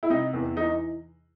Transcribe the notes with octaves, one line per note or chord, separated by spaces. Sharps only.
E4
C3 D#4
E2
E3 D#4